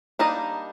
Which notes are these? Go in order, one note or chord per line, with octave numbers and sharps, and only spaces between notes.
G3 A#3 D4 D#4 D#5